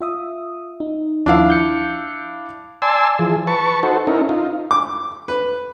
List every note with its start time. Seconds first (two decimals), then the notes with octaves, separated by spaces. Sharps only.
0.01 F4 E5 D#6
0.80 D#4
1.26 D#2 F3 D4 E4 F5
1.50 G6 C#7
2.82 D5 G#5 A5 C6 E6
3.19 E3 F3 G#4
3.47 B4 A5 C#6
3.83 D#4 F#4 A4 C5
4.07 C#4 D#4 E4 A#4
4.29 D#4 F4
4.71 D6
5.28 B4